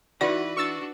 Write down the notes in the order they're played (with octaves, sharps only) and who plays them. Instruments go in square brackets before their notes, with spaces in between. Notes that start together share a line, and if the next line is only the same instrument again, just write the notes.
[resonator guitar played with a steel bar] E3 [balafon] D#4 D5 [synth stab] F#4 [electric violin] B4
[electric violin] D4 F#4 [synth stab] C#6 E6 A6